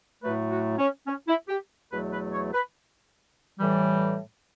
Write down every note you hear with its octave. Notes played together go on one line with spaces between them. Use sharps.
A2 F#3 A3 B4
F#4
C#4
C#4
E4
G4
E2 B2 F#3 A3 B4
B4
C#5
B4
A2 E3 G3